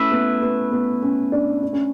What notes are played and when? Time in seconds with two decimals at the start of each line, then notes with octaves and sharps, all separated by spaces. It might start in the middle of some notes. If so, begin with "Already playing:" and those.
Already playing: A3 C#4 E4 B4 E5
0.11 B3
0.42 B3
0.72 B3
1.02 C#4
1.32 D4
1.63 D4
1.73 C#4